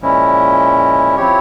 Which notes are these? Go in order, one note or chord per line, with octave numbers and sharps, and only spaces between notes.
A#2 F3 G#3 C#4 E4
F3 C4 E4 G4 C#5